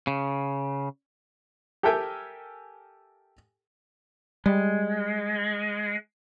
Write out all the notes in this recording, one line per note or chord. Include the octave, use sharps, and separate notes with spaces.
C#3
G4 A4 A#4 E5 G5 G#5
G3 G#3